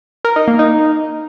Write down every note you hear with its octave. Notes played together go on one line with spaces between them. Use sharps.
A#4
D#4
A#3
D#4